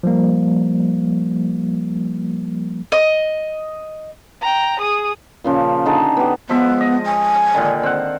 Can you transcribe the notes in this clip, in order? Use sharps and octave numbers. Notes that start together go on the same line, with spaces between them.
F3 G3 A#3
D#5
G5 A#5
G#4 D#6
A#2 C#3 F3
D3 D#4 G#4 A5
B3 G4
F3 G#3 B3 E5
D#5
G#5
A#2 D3 D#3
C4 F#5